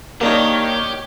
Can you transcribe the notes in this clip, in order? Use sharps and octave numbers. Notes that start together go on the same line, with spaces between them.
D#3 A#3 D4 D#4 G4 C#5